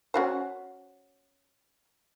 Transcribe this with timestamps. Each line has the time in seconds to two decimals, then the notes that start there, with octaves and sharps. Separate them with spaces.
0.14 C#4 F#4 C5